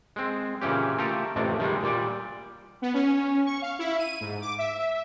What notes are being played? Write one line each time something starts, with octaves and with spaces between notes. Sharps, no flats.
G#3 C4
A#2 C#3 E3 C#4 G4
A3 F4 G4 A4 A#4
A1 F2 C3 A3 D5
D#3 G3 G#3
A#2 G3 D5
B3
C#4
C#6
F5
E4
D#7
G#2
D6
E5